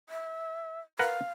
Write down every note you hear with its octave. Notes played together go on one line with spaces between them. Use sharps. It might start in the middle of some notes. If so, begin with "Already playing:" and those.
E5
A#4 B4 F5 F#5